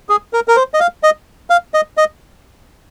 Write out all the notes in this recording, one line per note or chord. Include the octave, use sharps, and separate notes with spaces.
G#4
A#4
A#4
C5
D#5
F5
D#5
F5
D#5
D#5